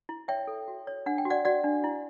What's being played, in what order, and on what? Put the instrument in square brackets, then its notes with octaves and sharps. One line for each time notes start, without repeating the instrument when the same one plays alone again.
[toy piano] E4
C#5 E5 G5
A4
F#4
C#5
D4 F#5
G5
F#4
D5 F#5
F#4 D5 F#5
D4
E4